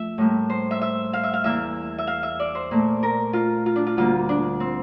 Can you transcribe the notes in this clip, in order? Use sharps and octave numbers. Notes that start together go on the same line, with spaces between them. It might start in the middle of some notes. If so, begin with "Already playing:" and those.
Already playing: F3 A3 E5
A2 G3 A#3
C5
E5
E5
F5
E5
F5
E2 E3 A#3 E5
E5
F5
E5
D5
C5
A#2 A3
A#4
F4
F4
D4
F4
D2 D3 G3 A#3 F4
D4
C4